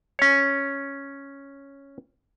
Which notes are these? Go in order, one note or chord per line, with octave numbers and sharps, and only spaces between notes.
C#4 C#5